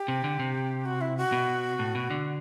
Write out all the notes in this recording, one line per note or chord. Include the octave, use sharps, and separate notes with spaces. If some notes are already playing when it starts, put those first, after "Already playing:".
Already playing: G4
C3
D3
C3
F#4
E4
F#4
B2
A2
B2
D3